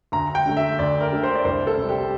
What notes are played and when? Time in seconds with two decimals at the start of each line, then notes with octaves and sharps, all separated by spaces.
0.12 D2 A#5
0.35 G5
0.46 D3 A3
0.57 E5
0.79 D2 D5
1.01 A#4
1.12 D3 A3
1.23 C5
1.35 D5
1.45 C2 C5
1.67 A4
1.77 C3
1.83 G3
1.89 G4